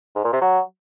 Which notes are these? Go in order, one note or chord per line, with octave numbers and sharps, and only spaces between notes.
G#2
A#2
C3
F#3